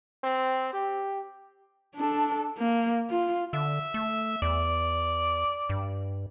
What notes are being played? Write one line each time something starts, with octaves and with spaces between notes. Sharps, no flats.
C4
G4
D4 A4
A#3
F4
D3 E5
A3
E2 D5
G2